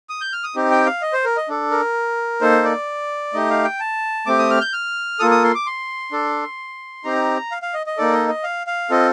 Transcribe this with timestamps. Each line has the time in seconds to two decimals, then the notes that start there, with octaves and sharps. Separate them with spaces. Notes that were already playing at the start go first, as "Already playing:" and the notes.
0.09 D#6
0.21 G6
0.33 F6
0.44 D#6
0.55 C4 D#4 G4
0.71 G5
0.86 F5
1.02 D#5
1.13 C5
1.24 A#4
1.37 D#5
1.49 D4 A4
1.71 A#4
2.41 A#3 D#4 A4 C5
2.64 D5
3.33 A3 D#4 G4 D#5
3.50 F5
3.64 G5
3.80 A5
4.26 A3 C4 G4 D6
4.38 D#6
4.50 F6
4.61 G6
4.73 F6
5.19 A#3 F4 A4 D#6
5.31 D#6
5.44 C6
5.55 D6
5.66 C6
6.11 D4 A4
7.04 C4 D#4 G4 A#5
7.51 F5
7.62 F5
7.74 D#5
7.86 D#5
7.98 A#3 D#4 A4 D5
8.13 D#5
8.29 D#5
8.43 F5
8.67 F5
8.90 C4 F4 A4 D#5